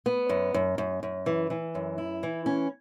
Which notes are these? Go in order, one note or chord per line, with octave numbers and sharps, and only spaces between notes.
B3
F#2
F#2
F#2
F#2
E3
E3
F#2
E4
E3
C#4